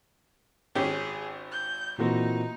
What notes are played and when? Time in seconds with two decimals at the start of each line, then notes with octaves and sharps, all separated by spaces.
0.75 G#1 C#4 G4 G#4
1.52 G6
1.99 A#2 E3 C4 D#4 F#4